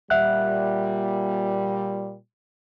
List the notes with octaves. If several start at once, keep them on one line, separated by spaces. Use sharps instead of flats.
A#2 G3 E5 F#5 F#6